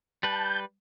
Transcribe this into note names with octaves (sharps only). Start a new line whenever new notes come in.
G3 B4 A5 G6